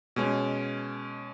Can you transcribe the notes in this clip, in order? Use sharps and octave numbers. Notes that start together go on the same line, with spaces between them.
B2 G#3 C#4